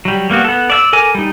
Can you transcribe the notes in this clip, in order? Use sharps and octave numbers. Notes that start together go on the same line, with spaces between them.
F#3 G3
G3 A#3 B3 F#4
B3 A4
D5 E5 E6
A4 A#4 G#5 D6
G3 D#4